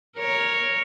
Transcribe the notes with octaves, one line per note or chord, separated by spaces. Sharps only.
A#4 C#5